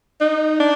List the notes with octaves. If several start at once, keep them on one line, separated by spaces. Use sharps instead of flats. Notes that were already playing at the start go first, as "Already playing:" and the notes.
D#4
D4